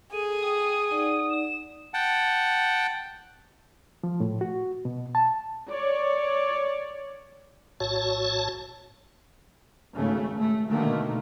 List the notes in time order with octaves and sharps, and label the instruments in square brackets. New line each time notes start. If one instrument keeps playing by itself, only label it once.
[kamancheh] G#4 [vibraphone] A4 [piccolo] D#7
[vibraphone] G5 [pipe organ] D#6
[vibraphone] D#4 D5 F#5
[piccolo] E7
[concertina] F#5 G5 A5
[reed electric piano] F3
A2
F#4
B2
A5
[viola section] C#5 D5
[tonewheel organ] A#1 A2 F#4 C#5 A5
[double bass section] G#1 C#3 A3
A3
B2 D3 D#3 A3 A#3